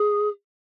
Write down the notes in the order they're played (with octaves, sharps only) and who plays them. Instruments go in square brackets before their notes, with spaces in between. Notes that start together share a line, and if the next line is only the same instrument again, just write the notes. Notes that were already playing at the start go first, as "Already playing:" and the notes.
Already playing: [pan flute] G#4